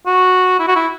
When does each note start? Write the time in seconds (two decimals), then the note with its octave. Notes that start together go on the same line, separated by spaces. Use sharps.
0.06 F#4
0.59 E4
0.68 F#4
0.76 E4